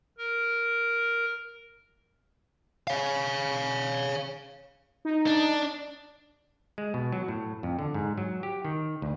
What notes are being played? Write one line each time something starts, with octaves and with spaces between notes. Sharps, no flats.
A#4
C#5 F5
D#4
D4
G#3
B2
F#3
A2
F2
D3
G#2
F#3
G4
D#3
D2